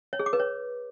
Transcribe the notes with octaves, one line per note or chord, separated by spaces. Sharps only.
C#5
G#4
D6
B4
C#5